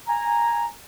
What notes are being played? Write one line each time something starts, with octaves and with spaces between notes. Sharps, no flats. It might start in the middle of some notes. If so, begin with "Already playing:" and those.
G#5 A#5